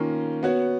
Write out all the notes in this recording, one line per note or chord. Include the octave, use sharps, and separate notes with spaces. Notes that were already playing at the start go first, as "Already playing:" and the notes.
Already playing: D#3 A#3 C#4 F4
B3 F#4 C#5